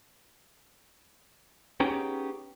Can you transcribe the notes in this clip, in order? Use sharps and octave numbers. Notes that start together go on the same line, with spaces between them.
B3 C#4 D#4 G4 G#4 A#5